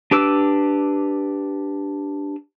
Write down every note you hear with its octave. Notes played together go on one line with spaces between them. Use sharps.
D4 G4 B4 D6 E6